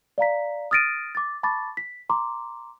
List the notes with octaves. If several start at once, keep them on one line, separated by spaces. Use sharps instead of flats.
D5 F5 A#5 B6
D#6 F6 A6 A#6 D7 D#7
D6 A6
A5 B5 C#6 D6 A6
B6
A#5 C6 D6